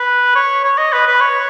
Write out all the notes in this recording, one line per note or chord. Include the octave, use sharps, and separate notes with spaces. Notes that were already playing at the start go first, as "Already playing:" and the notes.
Already playing: B4
C#5
C#5
D#5
B4
B4
C#5